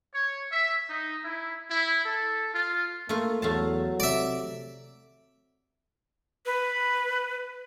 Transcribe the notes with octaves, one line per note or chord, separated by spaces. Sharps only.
C#5
E5
D#4
E4
E4
A4
F4
A3 A#3 F4
E2 F#3 A3 F5 A5
C3 D5 E5
B4